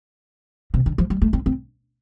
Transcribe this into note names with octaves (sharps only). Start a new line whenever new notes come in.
C3
D3
F3
G3
A3
C4
C4